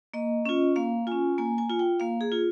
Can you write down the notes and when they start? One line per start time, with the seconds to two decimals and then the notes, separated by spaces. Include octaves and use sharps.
0.14 A#3 D#5
0.45 C#4 F4
0.76 A#3 F5
1.07 C#4 F4 G#5
1.38 A#3 G#5
1.58 G#5
1.70 F4
1.79 G5
2.00 A#3 F5
2.21 G#4
2.32 F4